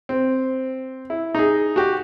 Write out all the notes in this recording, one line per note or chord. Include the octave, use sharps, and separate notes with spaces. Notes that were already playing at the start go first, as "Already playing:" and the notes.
C4
E4
D#4 G#4
F#4 G4